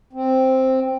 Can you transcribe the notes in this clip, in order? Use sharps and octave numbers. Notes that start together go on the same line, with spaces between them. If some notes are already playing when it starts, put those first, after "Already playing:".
C4